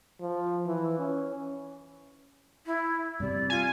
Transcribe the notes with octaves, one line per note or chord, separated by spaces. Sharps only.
F3
E3
C#4
E4
G2 C3 G3 D5
F4 G#5